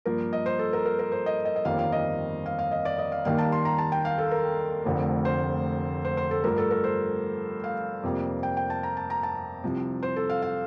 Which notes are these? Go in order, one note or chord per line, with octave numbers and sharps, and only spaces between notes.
G2 F3 A#3 A#4
D#5
C5
A4
A#4
A#4
A#4
C5
D#5
D#5
D#5
G1 F2 D#3 G3 A#3 F5
F5
D#5
F5
F5
D#5
D5
D#5
F5
D#2 D#3 G3 A#3 F5
A5
C6
A#5
A5
G5
F5
A4
A#4
F1 F2 D3 A3
C5
C5
C5
A4
G2 F3 A3 A#4
A4
A#4
C5
F5
F2 C3 G3 A#3
G5
G5
A5
A#5
A5
A#5
A5
C2 C3 F3
C5
A4
F5
F5